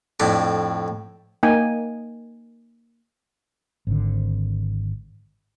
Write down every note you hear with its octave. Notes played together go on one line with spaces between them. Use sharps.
F2 A2 D4
A#3 D#4 G5 G#5
G#1 D3